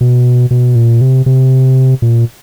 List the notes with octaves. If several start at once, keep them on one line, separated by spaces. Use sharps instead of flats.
B2
B2
A#2
C3
C3
A#2